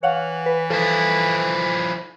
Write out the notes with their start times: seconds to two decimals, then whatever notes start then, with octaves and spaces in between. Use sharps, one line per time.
0.03 E3 C#5 F5 F#5
0.46 B4
0.70 F3 E4 A4